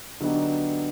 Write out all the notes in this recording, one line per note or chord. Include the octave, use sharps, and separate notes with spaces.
D3 F#3 B3 D#4 G4